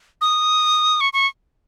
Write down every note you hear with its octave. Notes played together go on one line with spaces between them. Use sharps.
D#6
C#6
C#6